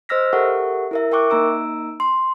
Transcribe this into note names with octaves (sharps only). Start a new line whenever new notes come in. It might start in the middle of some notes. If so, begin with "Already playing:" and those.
C5 D#5 E6 F6 A#6 B6
G4 A4 A#4 E5 F#5 C#6
E4 A#4 E5
A#4 E5 G5 C#6 D6 F#6
A#3 D#4 A#5 E6 D7
C6